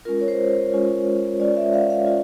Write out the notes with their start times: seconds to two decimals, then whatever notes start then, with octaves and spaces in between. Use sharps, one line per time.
0.05 G#3 C#4 F4 A#4
0.21 C#5
0.28 C5
0.73 G#3 C#4 F4
1.40 G#3 C#4 F4 D5
1.57 E5
1.74 F5
1.90 F5
2.06 C#4 F4